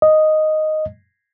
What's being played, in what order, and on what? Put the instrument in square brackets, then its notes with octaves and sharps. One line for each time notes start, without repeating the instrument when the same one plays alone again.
[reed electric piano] D#5